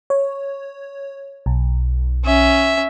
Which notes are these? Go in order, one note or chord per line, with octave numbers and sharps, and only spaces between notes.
C#5
B1
C#4 E5